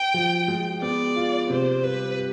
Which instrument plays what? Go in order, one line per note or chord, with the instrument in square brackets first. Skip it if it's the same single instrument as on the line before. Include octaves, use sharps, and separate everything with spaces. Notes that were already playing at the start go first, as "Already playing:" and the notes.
Already playing: [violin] G5
[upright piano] F3
G#3
[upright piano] B3 [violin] D5
[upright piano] F4
[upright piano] C3 [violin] C5
[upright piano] G3 [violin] B4
[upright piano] G3